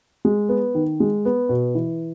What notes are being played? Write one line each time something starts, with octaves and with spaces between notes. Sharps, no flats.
G#3
B3
D#3
G#3
B3
B2
E3